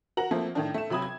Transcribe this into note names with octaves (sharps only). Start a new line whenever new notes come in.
F#4 A#4 A#5 F#7
F3 A3 A#3 C4
A2 D#3 D4
A3 E7
C3 F#3 B5 D#6 G#6
G#6